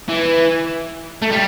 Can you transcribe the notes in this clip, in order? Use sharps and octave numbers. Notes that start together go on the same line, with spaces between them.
E3
A3
G3